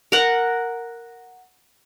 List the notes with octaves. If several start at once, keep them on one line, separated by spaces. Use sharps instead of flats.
A#4 F#5